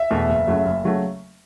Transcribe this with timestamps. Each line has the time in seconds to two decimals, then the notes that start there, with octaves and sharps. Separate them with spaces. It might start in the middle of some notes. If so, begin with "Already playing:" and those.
Already playing: E5
0.11 E2 B2 A3
0.29 F#1
0.47 F#2 C#3 F#3 A3
0.66 F#1
0.84 C#3 F#3 A3